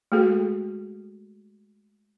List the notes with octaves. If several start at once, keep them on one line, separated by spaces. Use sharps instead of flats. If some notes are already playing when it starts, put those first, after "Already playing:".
G#3 A3 F#4 G#4 A4